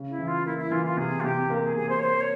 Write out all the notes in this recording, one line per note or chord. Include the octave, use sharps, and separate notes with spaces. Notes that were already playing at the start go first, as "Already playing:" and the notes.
Already playing: C#3
E4
E3
F4
A#3 E4
E4
E3 F4
F4
C3 G#4
F4
C3 G4
A#3
G#4
C3 G#4
C5
C#5
A#3 C5
C#5